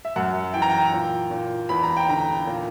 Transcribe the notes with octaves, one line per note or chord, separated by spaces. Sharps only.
E5
F#2 F#5
E3 G5
A#5
G5
A#2
A#2
E2 B5
A#5
G5
D3 A#5
A#2